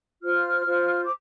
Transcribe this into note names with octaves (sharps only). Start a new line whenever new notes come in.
F4 C5 F6
F4 C5
D6